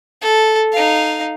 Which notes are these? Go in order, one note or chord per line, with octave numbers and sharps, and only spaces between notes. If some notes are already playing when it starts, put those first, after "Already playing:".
A4
D#4 F5